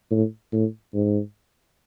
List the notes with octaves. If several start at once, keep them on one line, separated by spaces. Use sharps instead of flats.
A2
A2
G#2